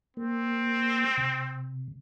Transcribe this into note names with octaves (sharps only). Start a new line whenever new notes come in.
A#3 C4
C3